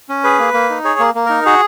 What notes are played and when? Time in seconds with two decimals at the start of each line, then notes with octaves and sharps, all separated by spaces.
0.09 C#4
0.24 G#4 B4
0.39 A#3
0.54 A#3
0.70 D#4
0.84 G#4 C#5
0.99 A#3
1.15 A#3
1.26 D#4 A#4
1.46 F#4 G#4